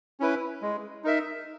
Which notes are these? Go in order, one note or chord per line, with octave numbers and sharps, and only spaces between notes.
C#4 E4 B4
G#3
D#4 A#4 E5